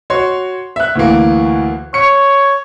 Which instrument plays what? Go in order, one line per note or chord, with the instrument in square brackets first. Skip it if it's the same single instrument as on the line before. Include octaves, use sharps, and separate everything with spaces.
[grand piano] F#4 C#5 C6
E5 F#6
D2 E3 A#3
[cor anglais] C#5 [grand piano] C#7